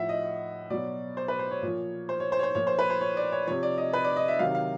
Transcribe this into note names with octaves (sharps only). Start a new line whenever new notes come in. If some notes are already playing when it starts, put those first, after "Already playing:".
Already playing: A2 F3 E5 F#5
D#5
B2 F#3 D5
C5
B4
C5
C#5
A#2 F3
C5
C#5
C5
C#5
C5
A#2 F3 C#5
C5
B4
C5
C#5
D5
C#5
C3 F3 C#5
D5
D#5
B4
D5
D#5
E5
C3 D#3 F#3 F5
F5